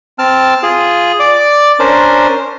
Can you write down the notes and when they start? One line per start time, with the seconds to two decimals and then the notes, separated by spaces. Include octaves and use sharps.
0.19 C4 A5 F6
0.63 F4 G#4
1.20 D5 D6
1.80 C#4 D4 A#4 C5